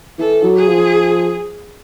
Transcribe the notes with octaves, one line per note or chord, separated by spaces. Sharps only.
E3 A4
F#3
G#4
F3